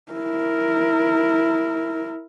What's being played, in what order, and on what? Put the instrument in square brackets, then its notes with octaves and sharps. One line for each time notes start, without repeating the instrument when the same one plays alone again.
[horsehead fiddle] E4 A#4